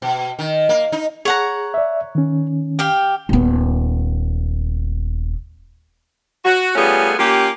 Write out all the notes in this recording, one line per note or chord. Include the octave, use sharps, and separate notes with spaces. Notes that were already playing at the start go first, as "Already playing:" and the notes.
B2
D#3
A#3
D#4
G#4 C#5 F#5 A#5
D5 E5
D#3 C#4
G4 F5 G5
D#1 B3
F#4
G3 A3 B3 C#4 F4 G#4
A#3 C#4 F4 G4